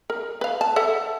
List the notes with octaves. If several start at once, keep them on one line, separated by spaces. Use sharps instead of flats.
A#4
B4 F5
A5
A4 E5 F#5